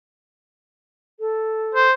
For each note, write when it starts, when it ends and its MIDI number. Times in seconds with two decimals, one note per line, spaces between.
1.20 1.87 69
1.75 1.92 72